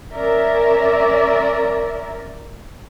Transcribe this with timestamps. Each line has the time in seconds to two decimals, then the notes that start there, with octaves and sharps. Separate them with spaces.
0.13 C#4 A#4 D5 E5